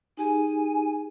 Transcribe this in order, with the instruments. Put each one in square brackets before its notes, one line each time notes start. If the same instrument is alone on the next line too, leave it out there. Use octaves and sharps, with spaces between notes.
[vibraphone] D#4 G4 G#4 [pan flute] G#5